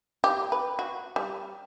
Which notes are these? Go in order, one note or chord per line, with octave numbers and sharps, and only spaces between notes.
G4
B4
F#4
G3